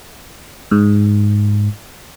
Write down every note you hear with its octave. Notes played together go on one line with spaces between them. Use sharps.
G#2